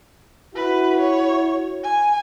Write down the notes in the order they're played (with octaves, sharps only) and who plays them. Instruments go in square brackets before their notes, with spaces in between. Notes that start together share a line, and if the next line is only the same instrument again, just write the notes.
[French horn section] E4 F#4 [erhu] B4
[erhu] C#5
G#5